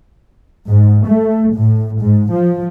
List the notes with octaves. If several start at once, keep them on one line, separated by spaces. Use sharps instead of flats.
G#2
A3
A2
G#2
F3